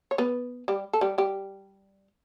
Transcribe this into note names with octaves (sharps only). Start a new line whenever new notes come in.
C#5
B3 B4
G3 G4
A4
G3 G4
G3 G4